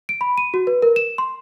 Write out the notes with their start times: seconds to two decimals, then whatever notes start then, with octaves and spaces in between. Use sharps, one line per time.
0.09 D7
0.21 B5
0.38 D#7
0.54 F#4
0.67 B4
0.82 A#4
0.96 E7
1.18 C6